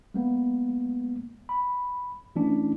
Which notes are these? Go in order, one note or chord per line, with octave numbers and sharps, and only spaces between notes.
G#3 A#3 B3
B5
E3 A3 C#4 D4 E4